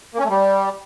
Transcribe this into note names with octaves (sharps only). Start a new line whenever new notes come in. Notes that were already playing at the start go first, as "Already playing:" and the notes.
A#3
C#4
A3
G3